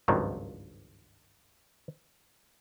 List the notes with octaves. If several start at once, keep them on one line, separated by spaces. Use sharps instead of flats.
G#1 C#2 G2 D#3 F3 F#3